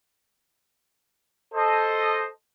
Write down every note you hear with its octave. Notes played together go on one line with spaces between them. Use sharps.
A4 C5 D#5